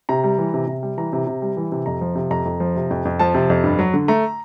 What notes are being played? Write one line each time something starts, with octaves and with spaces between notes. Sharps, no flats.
C3 A#5
G3
E3
C3
C3
G3
E3 A#5
C3
C3
G3
E3
C3
F2 A#5
F3
C3
F2 A#5
F2
F3
C3
F2
F2
F3 A5
C3
F2
G2
F#3
D3
A3 A#5